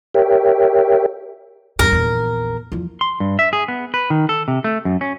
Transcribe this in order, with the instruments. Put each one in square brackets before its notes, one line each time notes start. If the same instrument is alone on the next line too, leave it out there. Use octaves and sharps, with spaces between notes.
[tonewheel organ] G4 A#4 C#5 E5 G5
[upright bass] E2 G2 [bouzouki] A#4
[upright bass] A#1 E2
E2 F3
[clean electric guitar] C6
G2
E5
G#4
B3
B4
D#3
A4
C3
A3
F#2
C#4